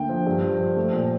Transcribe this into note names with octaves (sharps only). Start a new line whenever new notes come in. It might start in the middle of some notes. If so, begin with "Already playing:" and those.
Already playing: D2 A#3 G5
F3
G2
F3
F3
A3
A#2